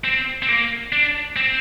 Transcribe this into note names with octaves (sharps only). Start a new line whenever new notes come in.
C4
C4
A#3
D4
C4